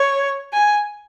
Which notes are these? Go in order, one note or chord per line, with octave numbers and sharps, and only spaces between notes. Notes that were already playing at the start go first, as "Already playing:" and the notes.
Already playing: C#5
G#5